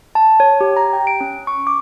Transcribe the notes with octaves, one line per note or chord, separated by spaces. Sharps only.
A5
C#5
G4
A#5
G5
D7
C#4
C#6
D6